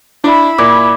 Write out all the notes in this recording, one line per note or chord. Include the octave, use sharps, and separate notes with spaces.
D4 E4 B5
A#2 D6 G#6